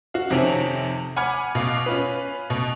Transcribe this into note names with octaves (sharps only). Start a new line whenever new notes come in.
F#4 F5
F2 C3 D#3 C4 C#4
F#5 G#5 B5 D6 F6 G#6
B2 F5 D6
C#4 F4 B4
B2